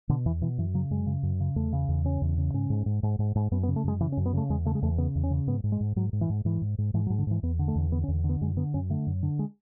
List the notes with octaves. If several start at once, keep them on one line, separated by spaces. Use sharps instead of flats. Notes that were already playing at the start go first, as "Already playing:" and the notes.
B2 D3
E2 E3
B2 E3
F#2 E3
C#3 F#3
F#2 G#3
C#3
F#2
C#3
E2 A3
C#3
E2
C#3 C#4
E2
C#3
G#2 C#4
G#2
G#2
G#2
G#2
G#2
F#2 B3
B3
C#3
A3
F#2 G#3
C#3 E3
C#4
F#2
B3
C#3 A3
E2 G#3
C#3 A3
G#3
E2 A3
C#3 B3
E2
C#4
C#3
G#2 B3
G#2
G#3
G#2
G#2 F#3
G#2
E3
G#2
G#2 E3
G#2
G#2
G#2 E3
F#3
G#2
D3
G#2 E3
E2 B3
D3
A3
E2
D3 B3
C#4
E2
D3
B3
F#2 G#3
D3 B3
F#2 C#4
D3 A3
F#2
D3
G#3